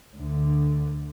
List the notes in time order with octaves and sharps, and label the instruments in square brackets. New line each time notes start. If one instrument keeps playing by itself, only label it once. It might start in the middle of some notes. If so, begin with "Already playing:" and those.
[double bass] D2 D3